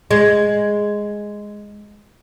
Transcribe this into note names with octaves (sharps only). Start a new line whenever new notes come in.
G#3